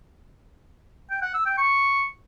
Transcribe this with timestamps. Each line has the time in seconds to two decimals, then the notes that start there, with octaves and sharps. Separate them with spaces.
1.10 G5
1.22 F#5
1.34 E6
1.46 G5
1.58 C#6